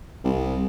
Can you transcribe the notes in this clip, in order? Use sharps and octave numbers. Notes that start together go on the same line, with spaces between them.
C2